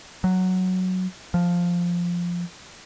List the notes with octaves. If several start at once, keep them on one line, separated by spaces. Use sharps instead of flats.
F#3
F3